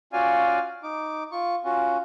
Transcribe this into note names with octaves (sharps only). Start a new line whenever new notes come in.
C#4 F4 F#4 D5 F5 G#5
D#4 D6
F4 C#6
C#4 F4 F#4